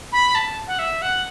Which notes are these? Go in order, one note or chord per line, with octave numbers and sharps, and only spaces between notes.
B5
A5
F#5
E5
F#5